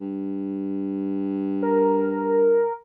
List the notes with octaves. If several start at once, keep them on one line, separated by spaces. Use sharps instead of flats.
G2
A#4